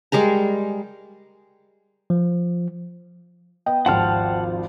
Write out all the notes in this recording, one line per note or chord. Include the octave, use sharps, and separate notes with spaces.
G3 G#3 A#4 A#5
F3
B3 D#5 G5
G#1 D#2 F3 F#5 A5 F6